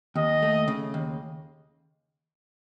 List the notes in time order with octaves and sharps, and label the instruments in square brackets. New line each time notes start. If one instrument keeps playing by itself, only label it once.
[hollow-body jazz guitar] D#2 [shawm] D#5
[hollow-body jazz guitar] A3
C#3
D#2